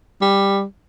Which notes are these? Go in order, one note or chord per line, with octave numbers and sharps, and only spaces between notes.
G3